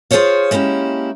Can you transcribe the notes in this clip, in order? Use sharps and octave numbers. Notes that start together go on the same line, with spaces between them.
F4 G#4 A4 C5 C#5 F5
G#3 A#3 C#4 E4 G4